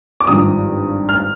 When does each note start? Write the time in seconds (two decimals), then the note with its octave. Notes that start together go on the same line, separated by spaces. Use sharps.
0.20 D6
0.27 G#1 G2 F3 D#6
1.09 F6